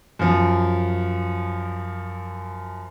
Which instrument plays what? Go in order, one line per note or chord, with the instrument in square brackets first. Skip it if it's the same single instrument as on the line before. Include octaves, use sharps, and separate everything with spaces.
[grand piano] F#2 F3